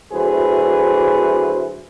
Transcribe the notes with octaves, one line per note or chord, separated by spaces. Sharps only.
D2 F#3 E4 G#4 B4 C5